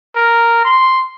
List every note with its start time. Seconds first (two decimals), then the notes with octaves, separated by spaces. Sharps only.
0.16 A#4
0.65 C6